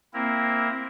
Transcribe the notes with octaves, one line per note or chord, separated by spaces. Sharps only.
A#3 C4 E4 A#4